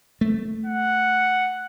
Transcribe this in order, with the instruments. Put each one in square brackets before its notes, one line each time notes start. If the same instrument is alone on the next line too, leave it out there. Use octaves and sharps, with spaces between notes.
[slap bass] A3
[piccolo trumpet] F#5